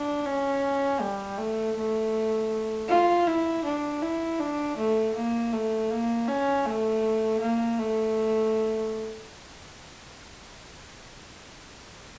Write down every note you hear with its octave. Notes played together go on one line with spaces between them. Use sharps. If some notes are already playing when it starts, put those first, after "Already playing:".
Already playing: D4
C#4
G3
A3
A3
F4
E4
D4
E4
D4
A3
A#3
A3
A#3
C#4
A3
A#3
A3